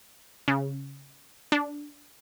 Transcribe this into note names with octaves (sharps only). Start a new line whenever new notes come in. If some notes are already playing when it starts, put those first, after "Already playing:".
C#3
D4